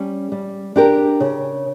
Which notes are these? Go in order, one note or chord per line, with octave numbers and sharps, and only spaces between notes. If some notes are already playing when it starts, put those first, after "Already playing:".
Already playing: G3 C#4
G3
D4 G4 A#4
C#3